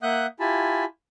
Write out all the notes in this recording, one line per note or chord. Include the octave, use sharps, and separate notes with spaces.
A#3 E5 F#5 D#6 F#6 G6
E4 F4 G4 G#5 A5 B5